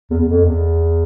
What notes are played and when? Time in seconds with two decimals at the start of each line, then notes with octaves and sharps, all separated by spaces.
0.10 E2
0.20 E2
0.28 F2
0.45 E2